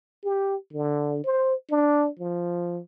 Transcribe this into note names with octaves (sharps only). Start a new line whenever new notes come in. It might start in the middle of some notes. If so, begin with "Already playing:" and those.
G4
D3
C5
D4
F3